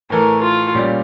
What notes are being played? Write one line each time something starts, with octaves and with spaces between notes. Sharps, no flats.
A2 E3 A3 A#4
F4
A#2 G3 C#4 G4 D5